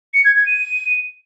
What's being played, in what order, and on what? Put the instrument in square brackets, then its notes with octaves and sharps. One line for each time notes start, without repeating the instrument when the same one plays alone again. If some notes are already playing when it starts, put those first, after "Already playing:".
[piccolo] C#7
G#6
G#6
D#7